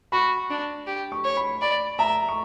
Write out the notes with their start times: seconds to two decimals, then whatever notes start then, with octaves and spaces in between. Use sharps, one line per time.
0.12 F#4 B5
0.50 D4
0.87 G4
1.12 C#6
1.24 C#5
1.37 B5
1.61 D5 B5
1.99 E5 A#5
2.28 C#6